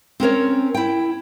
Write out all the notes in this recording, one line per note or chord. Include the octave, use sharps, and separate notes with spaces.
C4 C#4 A#4 C#5
E4 G5